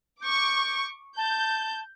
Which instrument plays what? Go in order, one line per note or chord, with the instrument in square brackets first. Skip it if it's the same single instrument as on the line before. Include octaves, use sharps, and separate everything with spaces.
[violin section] C#6 D6 [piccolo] G6
[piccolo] A5 [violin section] G6